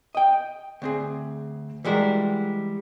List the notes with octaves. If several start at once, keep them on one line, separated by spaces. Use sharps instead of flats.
D#5 G5
D2 C4 G#4
E3 G3 G#3 F#4 A#4